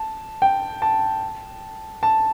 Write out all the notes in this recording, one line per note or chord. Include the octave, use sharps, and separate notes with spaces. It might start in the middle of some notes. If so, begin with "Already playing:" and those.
Already playing: A5
G5
A5
A5